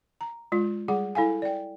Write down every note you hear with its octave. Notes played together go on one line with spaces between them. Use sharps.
A#5
G#3 F4
G3 G#4 F#5
E4 A4 F5 G#5
D5 G5